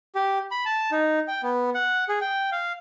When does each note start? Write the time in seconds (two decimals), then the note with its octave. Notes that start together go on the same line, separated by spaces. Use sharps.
0.15 G4
0.51 B5
0.65 A5
0.91 D#4
1.28 G5
1.43 B3
1.75 F#5
2.09 G#4
2.21 G5
2.52 F5